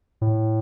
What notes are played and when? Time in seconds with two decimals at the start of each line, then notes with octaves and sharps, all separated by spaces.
0.21 A2